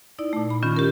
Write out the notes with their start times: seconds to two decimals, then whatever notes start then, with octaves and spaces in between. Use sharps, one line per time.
0.19 D#4 E4 D5
0.33 A#2 A3
0.50 B5
0.63 D#3 C#4 F4
0.76 G4 A#4